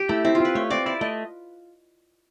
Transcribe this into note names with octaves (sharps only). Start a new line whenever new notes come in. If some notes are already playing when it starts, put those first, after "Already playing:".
Already playing: G4
A3 E4
C4 E4
F4
C4 B4
A3 C#5
C4 D5
E4 D5
A3 D#5